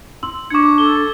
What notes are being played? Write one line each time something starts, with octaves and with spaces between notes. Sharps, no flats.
C6 E6 F#7
D4 C#6 D6 G#6 C#7
A4 G7